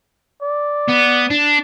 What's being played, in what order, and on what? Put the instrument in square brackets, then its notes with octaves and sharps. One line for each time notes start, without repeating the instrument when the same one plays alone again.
[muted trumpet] D5
[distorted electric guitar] B3
D4